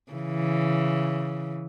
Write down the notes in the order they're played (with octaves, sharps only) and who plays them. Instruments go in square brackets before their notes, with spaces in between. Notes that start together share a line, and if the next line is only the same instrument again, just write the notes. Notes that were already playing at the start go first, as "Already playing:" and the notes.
[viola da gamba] C#3 E3